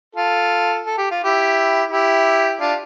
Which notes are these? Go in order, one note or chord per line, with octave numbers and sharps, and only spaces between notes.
F4 A4
A4
G4
F4
E4 G4
E4 G4
D4 F4